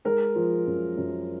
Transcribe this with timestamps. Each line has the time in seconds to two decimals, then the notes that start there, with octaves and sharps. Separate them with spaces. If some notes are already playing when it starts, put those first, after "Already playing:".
0.05 G#3 A#4
0.35 F3
0.66 F#2
0.97 F#2